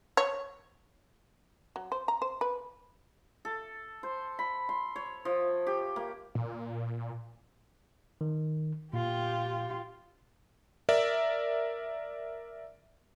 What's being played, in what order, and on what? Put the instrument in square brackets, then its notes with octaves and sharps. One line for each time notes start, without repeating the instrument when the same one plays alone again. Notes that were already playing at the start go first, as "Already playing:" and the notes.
[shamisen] C#5
F#3
C5
A#5
C5
B4
[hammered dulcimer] A4
C5
B5
C6
C#5
F3
G4
A#3
[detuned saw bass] A#2
[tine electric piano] D#3
[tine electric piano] A#2 [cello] F4 G4
[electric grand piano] A#4 D5 E5